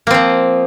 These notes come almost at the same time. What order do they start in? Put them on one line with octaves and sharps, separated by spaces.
A#3 C4 F3